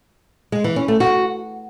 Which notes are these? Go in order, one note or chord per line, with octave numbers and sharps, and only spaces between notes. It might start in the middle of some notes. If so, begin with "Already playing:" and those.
G#3
E3
C#4
A3
F#4